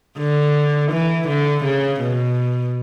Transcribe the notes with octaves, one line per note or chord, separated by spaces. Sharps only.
D3
E3
D3
C#3
B2